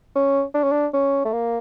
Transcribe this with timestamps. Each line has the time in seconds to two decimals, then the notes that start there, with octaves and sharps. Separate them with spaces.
0.15 C#4
0.54 D4
0.63 C#4
0.72 D4
0.94 C#4
1.25 A3
1.33 A#3